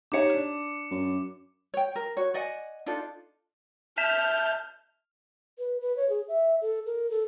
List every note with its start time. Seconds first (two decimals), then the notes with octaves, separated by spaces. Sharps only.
0.12 D#4 G4 C#5 D6 C#7
0.34 D4
0.91 F#2
1.74 C#5 G5
1.95 A#4
2.17 F#4 C#5
2.34 D5 D#5 F#5 G#5
2.86 D4 D#4 F4 A4
3.98 E5 A5 F6 G6
5.59 B4
5.81 B4
5.97 C#5
6.10 G#4
6.28 E5
6.61 A4
6.86 A#4
7.11 A4